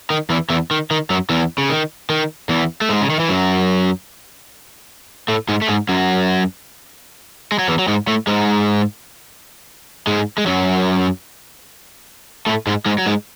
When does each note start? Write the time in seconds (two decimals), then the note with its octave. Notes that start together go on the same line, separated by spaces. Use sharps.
0.10 D#3
0.30 E2 E3
0.50 E2 E3
0.71 D#3
0.91 D#3
1.10 F#2 F#3
1.30 E2 E3
1.58 C#3
1.70 D#3
2.10 D#3
2.49 E2 E3
2.81 A3
2.89 G#2 G#3
3.01 C#3
3.10 D#3
3.20 E3
3.29 F#2 F#3
5.28 A2 A3
5.49 G#2 G#3
5.62 A3
5.68 G#2 G#3
5.89 F#2 F#3
7.52 G#3
7.59 F#3
7.68 E2 E3
7.79 F#3
7.88 G#2 G#3
8.07 A2 A3
8.27 G#2 G#3
10.07 G#2 G#3
10.38 G#3
10.46 F#2 F#3
12.46 A2 A3
12.67 G#2 G#3
12.86 G#2 G#3
12.98 F#3
13.06 G#2 G#3